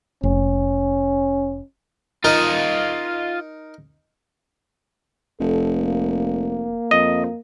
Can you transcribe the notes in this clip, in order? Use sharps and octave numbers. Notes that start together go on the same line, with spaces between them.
F1 C#4
D#4 F4 A#4 D#5
F1 A4
A#3
F2 D#5